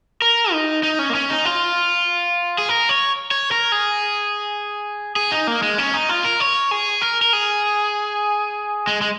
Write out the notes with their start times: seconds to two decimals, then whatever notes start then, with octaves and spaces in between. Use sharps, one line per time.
0.22 A#4
0.52 D#4
0.83 D#4
0.99 C#4
1.10 A#3
1.15 C#4
1.30 D#4
1.45 F4
2.58 G#4
2.69 A#4
2.89 C#5
3.31 C#5
3.51 A#4
3.72 G#4
5.16 G#4
5.32 D#4
5.47 A#3
5.62 G#3
5.78 C#4
5.93 D#4
6.09 F4
6.25 A#4
6.40 C#5
6.71 G#4
7.01 A#4
7.22 A#4
7.33 G#4
8.87 G#3
9.01 G#3